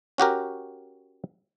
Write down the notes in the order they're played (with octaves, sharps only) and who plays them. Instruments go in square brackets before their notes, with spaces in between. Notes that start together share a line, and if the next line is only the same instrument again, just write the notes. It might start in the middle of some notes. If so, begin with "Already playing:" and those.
[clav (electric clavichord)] C#4 F#4 G4 A#4